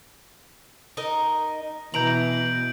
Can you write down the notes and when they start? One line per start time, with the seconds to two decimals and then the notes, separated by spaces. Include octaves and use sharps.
0.97 D#4 A#4 D#5
1.94 B2 E3 A#5 G6 D7 F#7